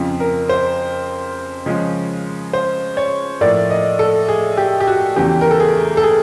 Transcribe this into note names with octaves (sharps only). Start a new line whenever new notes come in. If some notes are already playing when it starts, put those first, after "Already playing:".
Already playing: F2 C#3 F3
A#4
C5
C#3 F3 G#3 C#4
C5
C#5
A2 F3 A#3 D5
D#5
A4
G#4
G4
G4
F#4
E2 C#3 E3 G4
A#4
A4
G#4
A4
G#4